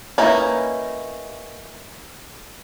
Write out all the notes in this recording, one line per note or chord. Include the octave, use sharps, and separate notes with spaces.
A#3 C#4 D#4 E4 B4